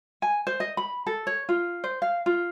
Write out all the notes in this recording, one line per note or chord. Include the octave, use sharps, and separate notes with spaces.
G#5
C5
D#5
B5
A4
C#5
F4
C5
F5
F4